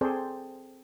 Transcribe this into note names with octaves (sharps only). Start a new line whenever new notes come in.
C4 G#4 A4 C5 D5